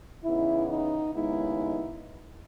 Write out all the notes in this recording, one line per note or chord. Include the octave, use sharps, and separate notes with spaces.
C#3 E3 B3 D#4 E4
D#4
D#2 C#3 G#3 B3 D#4 E4